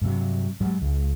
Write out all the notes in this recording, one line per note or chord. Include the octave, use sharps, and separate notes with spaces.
G2 C3 F#3
G#2 F#3 G3
C#2